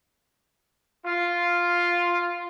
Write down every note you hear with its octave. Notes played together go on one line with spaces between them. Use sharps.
F4